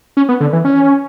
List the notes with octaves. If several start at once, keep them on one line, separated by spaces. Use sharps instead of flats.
C#4
B3
D3
E3
C#4